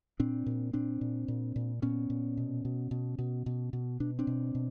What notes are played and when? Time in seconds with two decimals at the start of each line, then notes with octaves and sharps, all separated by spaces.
0.20 A#2 C4 D4
0.46 A#2
0.73 A#2 C4 D4
1.01 A#2
1.28 A#2
1.56 A#2
1.82 A#2 B3 C#4
2.10 A#2
2.37 B2
2.65 B2
2.91 B2
3.19 B2
3.46 B2
3.73 B2
4.00 B2 D4
4.19 C4 D4
4.27 B2
4.55 B2